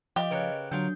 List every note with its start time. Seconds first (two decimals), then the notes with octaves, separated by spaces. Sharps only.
0.16 F3 G4 D#5 F5
0.31 C#3 A#4 B4 C#5 F#6
0.72 D3 F#3 D4 F4 A#4 G6